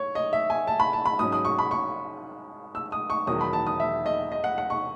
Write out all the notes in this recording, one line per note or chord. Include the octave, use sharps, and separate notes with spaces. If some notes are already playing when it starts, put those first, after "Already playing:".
Already playing: C#5
D#5
E5
G#5
A5
B5
A5
B5
G#2 F#3 C#4 D#6
D#6
C#6
B5
C#6
E6
D#6
C#6
E1 E2 D#3 F#3 D#6
B5
A5
D#6
E5
D#5
D#5
F#5
F#5
C#6